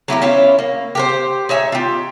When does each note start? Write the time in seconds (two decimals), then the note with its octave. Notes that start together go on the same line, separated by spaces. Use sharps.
0.08 F#3 E4 G4 A#4
0.22 C#4 E4 F4 C#5
0.59 A#3
0.95 G4 A#4 C5
1.49 D#4 C#5 E5 G#5
1.72 F4 G4